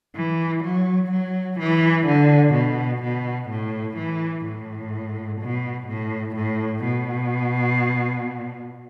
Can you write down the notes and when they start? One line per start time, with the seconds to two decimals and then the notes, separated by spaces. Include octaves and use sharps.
0.16 E3
0.64 F#3
1.11 F#3
1.59 E3
2.07 D3
2.55 B2
3.03 B2
3.50 A2
3.97 E3
4.46 A2
5.41 B2
5.88 A2
6.35 A2
6.84 B2